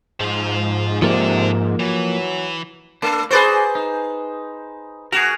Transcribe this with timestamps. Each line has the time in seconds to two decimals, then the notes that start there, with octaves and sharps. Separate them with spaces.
0.20 G#2 F3 F4
1.02 C3 F3 A#3 A4 D5
1.80 E3 F#3
3.02 A3 D4
3.31 F#4 G#4 B4 C5 D5
3.75 D#4
5.12 F#4 G#4 A#4